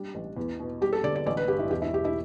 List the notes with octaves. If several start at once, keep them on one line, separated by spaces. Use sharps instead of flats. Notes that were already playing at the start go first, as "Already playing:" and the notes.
Already playing: G3 D4
A1
E2
B2
G3 G4
A4
D3 D5
D5
A1 D5
B4
G2 G4
E4
E1 G4
E4
B2 G4
E4